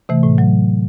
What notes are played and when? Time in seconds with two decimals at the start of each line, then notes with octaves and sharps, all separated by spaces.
0.09 C3 E3 A3
0.23 A2
0.38 F#3